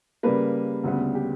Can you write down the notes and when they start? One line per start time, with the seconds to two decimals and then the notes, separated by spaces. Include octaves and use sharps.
0.23 C#3 G3 A#3 B4
0.84 D2 C#3 G3 B3
1.15 G4